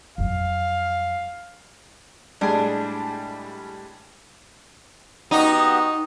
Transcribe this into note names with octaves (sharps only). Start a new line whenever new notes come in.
F2 F#3 F5
A2 G3 G#3 D4 G#4
B3 D#4 F#4 G4